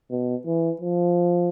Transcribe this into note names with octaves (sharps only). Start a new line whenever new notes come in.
B2
E3
F3